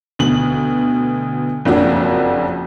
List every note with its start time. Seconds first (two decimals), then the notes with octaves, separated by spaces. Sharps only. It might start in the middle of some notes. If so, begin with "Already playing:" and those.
0.19 D2 B2 F#7
1.65 F#1 F2 D4 F#4